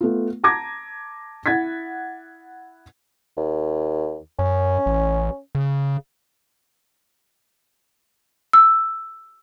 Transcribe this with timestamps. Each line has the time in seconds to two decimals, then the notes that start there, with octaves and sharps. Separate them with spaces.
0.01 A3 B3 F4
0.44 A5 A#5 D6 G#6 A#6
1.46 E4 F#5 G#6 A6 B6
3.37 D#2
4.39 F#2 C#4
4.86 A1
5.55 C#3
8.53 E6